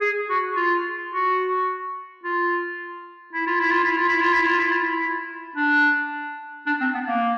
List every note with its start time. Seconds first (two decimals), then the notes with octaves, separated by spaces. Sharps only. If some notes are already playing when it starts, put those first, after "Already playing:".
0.01 G#4
0.30 F#4
0.56 F4
1.13 F#4
2.24 F4
3.34 E4
3.47 F4
3.60 E4
3.71 F4
3.84 E4
3.97 F4
4.09 E4
4.22 F4
4.34 E4
4.47 F4
4.59 E4
4.72 F4
4.84 E4
5.56 D4
6.67 D4
6.81 C4
6.95 B3
7.08 A#3